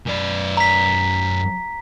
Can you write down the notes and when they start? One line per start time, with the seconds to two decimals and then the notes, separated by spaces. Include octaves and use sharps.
0.06 F#2 D5
0.57 A#5 B6